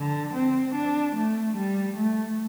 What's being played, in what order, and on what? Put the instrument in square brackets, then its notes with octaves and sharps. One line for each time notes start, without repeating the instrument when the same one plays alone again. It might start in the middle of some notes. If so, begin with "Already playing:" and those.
Already playing: [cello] D3
C4
D4
A3
G3
A3